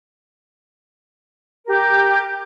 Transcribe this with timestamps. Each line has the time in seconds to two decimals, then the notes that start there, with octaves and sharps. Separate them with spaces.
1.65 G4 A#4